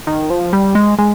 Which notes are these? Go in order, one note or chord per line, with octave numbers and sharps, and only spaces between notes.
D#3
F3
G3
G#3
G#3